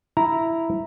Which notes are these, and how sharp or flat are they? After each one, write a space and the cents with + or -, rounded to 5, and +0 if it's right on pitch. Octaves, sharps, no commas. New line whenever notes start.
E4 +0 A#5 +0